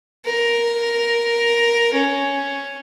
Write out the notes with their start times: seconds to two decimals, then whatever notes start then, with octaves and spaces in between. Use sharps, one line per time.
0.26 A#4
1.94 C#4